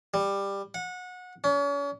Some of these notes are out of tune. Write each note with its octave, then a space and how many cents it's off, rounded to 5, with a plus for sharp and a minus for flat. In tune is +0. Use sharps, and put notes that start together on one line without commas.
G3 +15
F#5 -25
C#4 +40